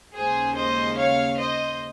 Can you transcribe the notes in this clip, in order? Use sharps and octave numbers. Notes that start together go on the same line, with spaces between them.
D#2 C#3 G#3 G#4 C5
C5 D#5
C#5 F5
C5 D#5